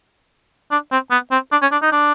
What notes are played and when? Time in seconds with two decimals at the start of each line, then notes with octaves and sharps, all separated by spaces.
0.71 D4
0.92 C4
1.11 B3
1.31 C4
1.52 D4
1.62 C#4
1.72 D4
1.82 D#4
1.92 D4